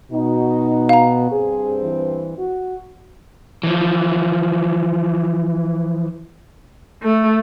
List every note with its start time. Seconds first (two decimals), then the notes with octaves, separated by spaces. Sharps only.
0.12 B2 D#4 F#4
0.89 F5 A#5
1.31 G2 C4 G#4 C5
1.83 E3
2.38 F#4
3.63 E3 F3
7.03 A3